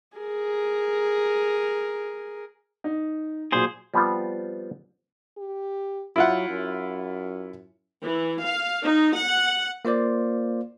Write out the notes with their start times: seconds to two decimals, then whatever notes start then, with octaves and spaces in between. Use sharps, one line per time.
0.17 G#4 A#4
2.84 D#4
3.52 A#2 F#3 G#4 C5
3.94 F3 G3 B3 C4 F4
5.38 G4
6.16 F#3 E4 F4 F#5
6.49 F#2
8.01 E3
8.42 F5
8.83 D#4
9.17 F#5
9.85 A#3 F4 C5 D5